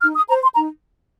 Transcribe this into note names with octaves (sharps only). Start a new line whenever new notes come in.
D#4 F6
D#6
C5 A#5
C6
D#4 A#5